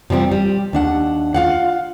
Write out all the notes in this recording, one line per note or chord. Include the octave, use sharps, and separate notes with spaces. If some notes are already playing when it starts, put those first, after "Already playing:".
C3 F3 G3 C4
G3
D#2 D4 F#5
F4 F5 F#5